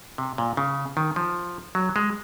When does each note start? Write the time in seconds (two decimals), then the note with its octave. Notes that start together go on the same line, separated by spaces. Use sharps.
0.18 C3
0.38 A#2
0.57 C#3
0.97 D#3
1.16 F3
1.75 F#3
1.96 G#3